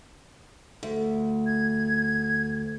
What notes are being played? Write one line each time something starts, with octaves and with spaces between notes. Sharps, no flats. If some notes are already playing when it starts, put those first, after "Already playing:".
D2
G#6